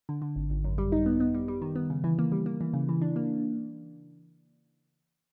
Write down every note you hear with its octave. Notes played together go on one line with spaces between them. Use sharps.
D3
D3
G#1
G#1
F#2
G3
D#4
B3
B3
G3
G3
D#3
B3
C#3
E3
A#3
G3
A#3
E3
C#3
E3
D4
A#3